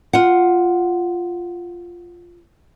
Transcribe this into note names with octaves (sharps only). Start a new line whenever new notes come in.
F4 F#5